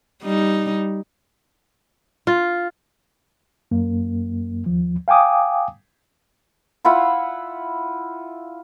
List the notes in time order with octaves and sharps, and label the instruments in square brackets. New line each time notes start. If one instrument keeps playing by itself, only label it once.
[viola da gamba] G3 D#4
[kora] F4
[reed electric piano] F#2 A#3
D#2 F3
F5 G5 G#5 D6 D#6
[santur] E4 F4 F#5 B5